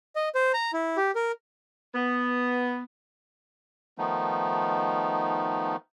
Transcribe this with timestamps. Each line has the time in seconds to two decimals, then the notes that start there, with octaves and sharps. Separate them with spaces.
0.16 D#5
0.35 C5
0.53 A#5
0.73 E4
0.97 G4
1.15 A#4
1.95 B3
3.98 D#3 F3 A3 B3 D#4